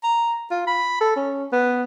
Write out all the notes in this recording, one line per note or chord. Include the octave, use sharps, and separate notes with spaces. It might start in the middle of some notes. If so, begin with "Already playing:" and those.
A#5
F4
B5
A4
C#4
B3